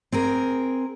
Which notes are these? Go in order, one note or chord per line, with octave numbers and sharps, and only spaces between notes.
C4 G#4 A#4